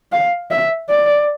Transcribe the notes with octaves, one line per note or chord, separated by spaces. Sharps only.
F5
E5
D5